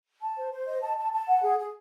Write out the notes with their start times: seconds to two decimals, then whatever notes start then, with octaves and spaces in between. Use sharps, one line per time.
0.21 A5
0.37 C5
0.52 C5
0.67 D#5
0.82 A5
0.97 A5
1.13 A5
1.28 F#5
1.42 G#4
1.58 G#4